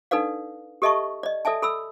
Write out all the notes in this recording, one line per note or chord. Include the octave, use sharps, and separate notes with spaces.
D4 D#4 A4 B4 D5 F5
G4 A4 D#5 E5 A5 C#6
D5 D#5
A4 D5 E5 G#5 A5
A4 B5 E6